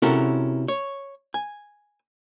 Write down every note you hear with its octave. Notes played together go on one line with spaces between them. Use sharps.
C3 C#4 E4 F#4 A4 A#4
C#5
G#5